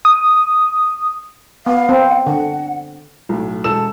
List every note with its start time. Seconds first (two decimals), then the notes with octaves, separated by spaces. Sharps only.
0.05 D#6
1.66 B3 F5
1.89 C4
2.26 D3 F#5
3.29 B1 A2
3.64 E1 A4 E6 E7